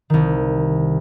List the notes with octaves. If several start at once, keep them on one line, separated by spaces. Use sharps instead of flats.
C2 D#3